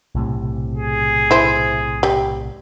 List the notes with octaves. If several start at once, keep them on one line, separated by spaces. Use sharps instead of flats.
B1 A2 C3
G#4
E4 C5
G3